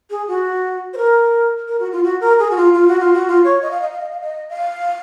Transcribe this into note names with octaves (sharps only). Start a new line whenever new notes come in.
G#4
F#4
C5
A#4
A#4
F#4
F4
F#4
A#4
G#4
F#4
F4
F4
F#4
F4
F#4
F4
C#5
D#5
F5
D#5
F5
D#5
F5
D#5
F5